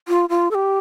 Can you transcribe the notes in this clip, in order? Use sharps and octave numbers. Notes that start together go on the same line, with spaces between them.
F4
F4
A4
G4